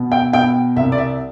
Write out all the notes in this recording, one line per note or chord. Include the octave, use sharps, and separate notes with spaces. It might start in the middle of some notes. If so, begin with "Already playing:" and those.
Already playing: B2
G5
B2 G5
C2 E5
D5
E5